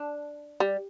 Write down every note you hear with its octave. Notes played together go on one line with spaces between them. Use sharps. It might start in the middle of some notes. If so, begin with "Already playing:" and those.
Already playing: D4
G3